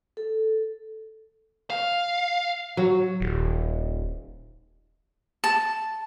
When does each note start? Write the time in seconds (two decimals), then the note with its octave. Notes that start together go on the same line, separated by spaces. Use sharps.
0.17 A4
1.70 F5
2.77 F#3
3.20 D#1
5.44 A5